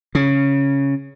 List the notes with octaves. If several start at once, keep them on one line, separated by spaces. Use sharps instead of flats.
C#3